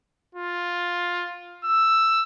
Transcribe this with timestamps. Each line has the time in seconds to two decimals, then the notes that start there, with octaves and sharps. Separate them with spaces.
0.35 F4
1.65 E6